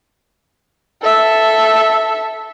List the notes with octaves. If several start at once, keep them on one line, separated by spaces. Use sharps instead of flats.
A4 E5